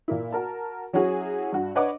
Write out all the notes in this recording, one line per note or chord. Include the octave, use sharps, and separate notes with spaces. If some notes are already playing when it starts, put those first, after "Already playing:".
A#2 A#3 E4
F#4 A#4 A5
F#3 C#4 E4 F#4 G#4
G2 F#4
D4 B4 C#5 D#5 F#5 D6